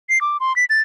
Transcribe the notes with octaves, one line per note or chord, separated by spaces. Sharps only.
C7
D6
C6
B6
A6